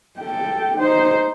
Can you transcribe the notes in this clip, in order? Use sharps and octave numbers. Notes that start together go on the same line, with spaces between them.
A4 G5
D#4 C5